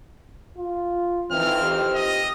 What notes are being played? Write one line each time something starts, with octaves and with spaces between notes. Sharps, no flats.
F4
F2 D#3 E3 C4 F6
G4
D#5